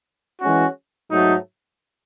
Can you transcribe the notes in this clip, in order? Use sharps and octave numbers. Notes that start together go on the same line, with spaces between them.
E3 G#3 C#4 F#4
G#2 F#3 A3 D#4